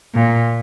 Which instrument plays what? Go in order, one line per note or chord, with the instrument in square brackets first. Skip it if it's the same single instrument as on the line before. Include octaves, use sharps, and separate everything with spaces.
[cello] A#2